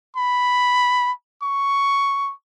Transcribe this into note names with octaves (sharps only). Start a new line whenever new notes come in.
B5
C#6